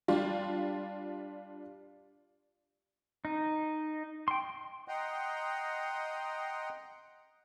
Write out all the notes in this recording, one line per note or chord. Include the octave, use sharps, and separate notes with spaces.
G3 D4 F4
D#4
G5 C6
D#5 F#5 G5 A#5 C6